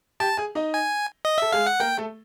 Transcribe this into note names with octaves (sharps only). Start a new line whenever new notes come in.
G4 G5 A5
G#4 G#5
D#4 D#5
G#5
D#5
A4 E5
G#3 G#4 F5
F#5
A#3 A#4 G5
A3 A4